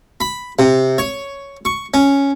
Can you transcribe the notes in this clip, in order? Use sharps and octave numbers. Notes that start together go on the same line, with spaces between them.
B5
C3
C#5
C#6
C#4